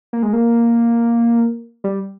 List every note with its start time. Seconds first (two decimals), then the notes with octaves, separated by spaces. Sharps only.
0.13 A#3
0.23 G#3
0.33 A#3
1.84 G3